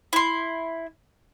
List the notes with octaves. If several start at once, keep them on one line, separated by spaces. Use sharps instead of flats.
E4 C6